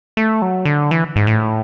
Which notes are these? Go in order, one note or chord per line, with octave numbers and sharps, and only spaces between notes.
A3
F#3
D3
E3
G#2
A2